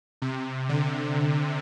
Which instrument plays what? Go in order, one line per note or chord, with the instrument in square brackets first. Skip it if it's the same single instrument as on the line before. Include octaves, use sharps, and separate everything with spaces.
[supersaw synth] C3
D3